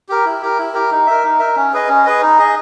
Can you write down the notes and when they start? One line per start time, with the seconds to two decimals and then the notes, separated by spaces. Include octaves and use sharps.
0.09 G4 A#4
0.26 E4
0.42 G4 A#4
0.58 E4
0.74 G4 A#4
0.91 D#4
1.07 A#4 E5
1.24 D#4
1.39 A#4 E5
1.56 C#4
1.73 G#4 B4 D#5
1.89 C#4
2.05 G#4 B4 D#5
2.22 D#4
2.38 G#4 D#5